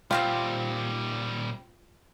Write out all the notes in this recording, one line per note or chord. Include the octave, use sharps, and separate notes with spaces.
A#2 G3 C4 C#4 F4 G4